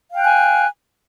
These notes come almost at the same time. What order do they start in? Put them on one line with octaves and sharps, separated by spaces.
F5 G5 F#6 G#5